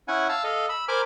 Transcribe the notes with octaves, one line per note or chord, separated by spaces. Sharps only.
C#4 E4 F#5 G#5
F5 A5 E6
A4 D#5 F5
B5 E6
A#4 C5 G#5 B5 D6 F6